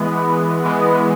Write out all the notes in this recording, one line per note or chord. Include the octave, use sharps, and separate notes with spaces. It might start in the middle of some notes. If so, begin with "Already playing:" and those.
Already playing: E3 G#3 B3
E3 G#3 B3